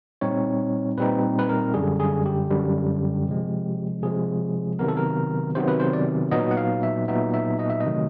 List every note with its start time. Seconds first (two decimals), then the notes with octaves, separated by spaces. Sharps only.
0.21 A#2 G3 C4 D#4 C#5
0.98 A#2 G3 C4 D#4 B4
1.39 B4
1.49 A#4
1.74 F#2 D3 G3 G#4
2.00 G#4
2.26 G4
2.50 F#2 D3 G3
3.27 C3 F3 G#3
4.03 C3 F3 G#3 G#4
4.79 C3 D#3 F#3 B3 A#4
4.88 A4
4.97 A#4
5.55 C3 D#3 F#3 B3 C5
5.68 B4
5.80 C5
5.93 D5
6.31 A#2 F#3 B3 D#4 D#5
6.51 F#5
6.57 F5
6.83 E5
7.08 A#2 F#3 B3 D#4 E5
7.34 E5
7.59 D#5
7.70 E5
7.80 D#5
7.85 C3 D#3 F#3 A3